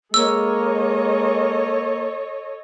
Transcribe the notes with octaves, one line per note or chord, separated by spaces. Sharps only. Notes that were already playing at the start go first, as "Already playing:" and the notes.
G#3 A#3 A4 C#5 D#5 E6